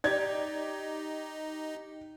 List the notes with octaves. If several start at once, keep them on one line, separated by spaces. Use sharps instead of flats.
D#4 G4 D5 G#6 A6